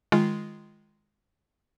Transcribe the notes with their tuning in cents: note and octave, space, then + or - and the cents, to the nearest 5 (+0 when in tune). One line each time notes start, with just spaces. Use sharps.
D#3 +0 G#3 +0 F4 -10